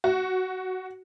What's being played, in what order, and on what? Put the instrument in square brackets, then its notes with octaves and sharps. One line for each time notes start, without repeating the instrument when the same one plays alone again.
[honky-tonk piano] F#4